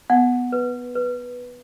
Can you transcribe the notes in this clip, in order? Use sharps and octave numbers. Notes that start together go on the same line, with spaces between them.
B3 F#5
B4
B4